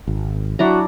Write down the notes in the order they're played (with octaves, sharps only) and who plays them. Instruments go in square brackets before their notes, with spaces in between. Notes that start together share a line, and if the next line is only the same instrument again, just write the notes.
[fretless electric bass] G#1
[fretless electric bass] F#3 [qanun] D4 E4 A#5 [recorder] F#4